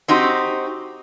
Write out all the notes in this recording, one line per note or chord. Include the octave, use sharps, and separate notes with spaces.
C4 D#4 F#4 G4